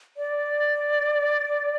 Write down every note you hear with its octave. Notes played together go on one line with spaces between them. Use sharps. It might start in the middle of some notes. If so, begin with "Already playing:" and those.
D5